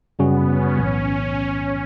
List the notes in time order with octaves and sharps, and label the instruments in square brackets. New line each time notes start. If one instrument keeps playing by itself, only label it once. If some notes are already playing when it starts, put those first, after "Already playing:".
[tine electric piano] F#2 C#3 G3 C#4 F#4 [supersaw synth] B3
[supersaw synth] C#4
[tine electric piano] B1 A2 E3 B3 [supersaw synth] C#4